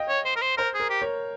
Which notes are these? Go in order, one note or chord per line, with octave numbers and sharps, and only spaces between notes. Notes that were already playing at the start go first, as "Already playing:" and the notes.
Already playing: D#5 F5 G5
C#5
C5
A#4
C5
A#4 C5
G#4
A#4
G4
A#4 C#5